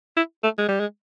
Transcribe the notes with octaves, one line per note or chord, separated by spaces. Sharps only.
E4
A3
G#3
G3
G#3